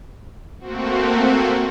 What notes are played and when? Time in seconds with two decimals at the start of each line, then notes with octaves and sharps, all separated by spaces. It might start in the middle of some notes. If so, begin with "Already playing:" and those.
0.59 A3 A#3 C4 F#4